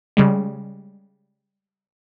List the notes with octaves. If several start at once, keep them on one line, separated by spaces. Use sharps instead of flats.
C#3 G3 G#3